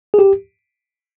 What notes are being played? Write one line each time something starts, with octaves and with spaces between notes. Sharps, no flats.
G#4
G4